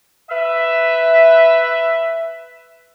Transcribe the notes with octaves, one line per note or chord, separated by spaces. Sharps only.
B4 E5